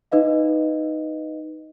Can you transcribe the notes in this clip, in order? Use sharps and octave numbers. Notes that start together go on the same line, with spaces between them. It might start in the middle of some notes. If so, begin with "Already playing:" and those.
D#4 B4 D#5 F5